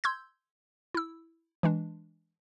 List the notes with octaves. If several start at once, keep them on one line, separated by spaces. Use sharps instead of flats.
C6 E6 G6 G#6
E4 E6
E3 G#3 D4